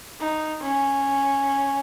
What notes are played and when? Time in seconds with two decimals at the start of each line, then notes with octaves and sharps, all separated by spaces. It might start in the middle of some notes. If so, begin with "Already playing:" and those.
0.20 D#4
0.61 C#4